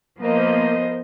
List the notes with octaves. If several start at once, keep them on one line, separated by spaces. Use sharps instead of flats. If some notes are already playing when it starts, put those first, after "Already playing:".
F3 A#3 B3 A#4 C5 D#5